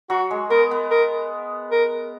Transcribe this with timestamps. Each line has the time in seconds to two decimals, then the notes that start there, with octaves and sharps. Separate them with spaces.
0.10 F#3 F#4
0.31 G#3
0.50 B3 A#4
0.71 B3
0.91 A#4
1.72 A#4